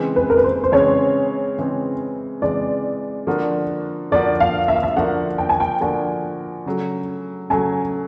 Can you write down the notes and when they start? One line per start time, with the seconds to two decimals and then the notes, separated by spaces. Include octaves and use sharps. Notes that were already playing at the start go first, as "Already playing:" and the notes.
Already playing: C#3 E3 G#3 C4
0.16 B4
0.30 A#4
0.38 B4
0.44 C5
0.64 C5
0.72 C#3 E3 G#3 C4 C#5
1.58 C#3 E3 G#3 C4
2.42 C#3 E3 G#3 C4 D5
3.27 D3 F3 A#3 D4 F#4
4.11 D3 F3 A#3 D4 F#4 D5
4.40 F5
4.68 E5
4.75 F5
4.83 E5
4.96 D3 F3 A#3 D4 F#4 F#5
5.38 G5
5.49 G#5
5.60 G5
5.81 D3 F3 A#3 D4 F#4 G#5
6.66 C#3 F#3 A3
7.50 C#3 F#3 A3 G#5